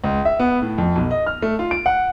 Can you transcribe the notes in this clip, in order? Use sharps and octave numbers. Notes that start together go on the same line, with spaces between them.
C#2
E5
B3
A2
F2
B1
D#5
F6
A3
F4
D7
F#5